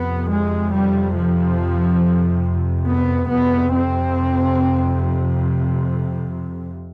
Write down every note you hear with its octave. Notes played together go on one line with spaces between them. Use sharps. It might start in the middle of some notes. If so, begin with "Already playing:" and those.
Already playing: F2 C3 B3
G#3
G3
F3
B3
F2 C3 B3
C4